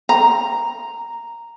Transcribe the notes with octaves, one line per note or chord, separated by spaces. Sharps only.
A#5